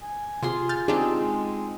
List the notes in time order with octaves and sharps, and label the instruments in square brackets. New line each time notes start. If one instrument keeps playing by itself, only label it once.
[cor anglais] G#5
[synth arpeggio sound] C3 [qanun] F4 G#4 C6
[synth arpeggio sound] F6 G6 A6
[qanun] C4 D#4 [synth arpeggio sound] D4 F4 G4 [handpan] G#4
[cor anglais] G#3